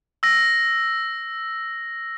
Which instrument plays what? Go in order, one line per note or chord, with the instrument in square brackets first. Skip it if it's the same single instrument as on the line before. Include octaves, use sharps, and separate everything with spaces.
[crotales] E6 A#6